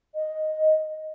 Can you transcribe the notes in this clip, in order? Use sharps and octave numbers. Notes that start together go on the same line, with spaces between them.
D#5